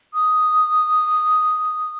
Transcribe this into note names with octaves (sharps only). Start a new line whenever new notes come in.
D#6